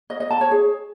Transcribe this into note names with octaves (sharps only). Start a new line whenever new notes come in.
D#5
D#5
A5
C#5
G#4